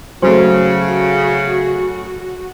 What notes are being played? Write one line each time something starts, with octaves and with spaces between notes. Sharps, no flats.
C#3 F#3 A3 F#4 C5